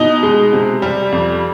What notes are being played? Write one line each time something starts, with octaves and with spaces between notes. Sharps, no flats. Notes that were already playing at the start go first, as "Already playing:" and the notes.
Already playing: B2 D#4 D#5
G#3
C3
G3
F2